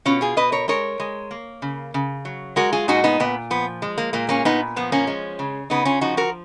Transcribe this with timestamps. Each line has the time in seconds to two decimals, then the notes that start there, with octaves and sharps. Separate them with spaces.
0.05 B2 C#4 F4
0.21 F4 G#4
0.37 B2 B4 D#5
0.52 A#4 C#5
0.68 G#3 A#4 C#5
1.00 G#3
1.31 A#3
1.62 C#3
1.94 C#3
2.25 F#3
2.56 G#3 F#4 A#4
2.73 F4 G#4
2.88 A#2 D#4 F#4
3.04 B3 D#4
3.20 A#2 B3
3.51 F3 B3
3.82 G#3
3.98 A#3
4.13 A#2 A#3
4.29 A#3 C#4
4.45 A#2 B3 D#4
4.76 F3 B3
4.92 A#3 C#4
5.07 G#3
5.39 C#3
5.70 C#3 B3 D#4
5.85 C#4 F4
6.01 F3 D#4 F#4
6.17 F#4 A#4